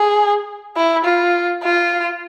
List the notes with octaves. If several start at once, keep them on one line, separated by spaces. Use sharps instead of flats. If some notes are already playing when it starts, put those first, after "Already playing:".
Already playing: G#4
E4
F4
F4